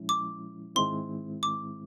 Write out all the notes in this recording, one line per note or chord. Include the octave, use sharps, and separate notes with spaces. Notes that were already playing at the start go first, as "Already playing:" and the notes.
Already playing: A#2 F3 G#3 C#4 E4
D6
G#2 D#3 G#3 C4 E4 C6
D6